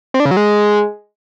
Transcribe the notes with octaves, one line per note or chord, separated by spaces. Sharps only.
C4
D4
C#3
F#3
G#3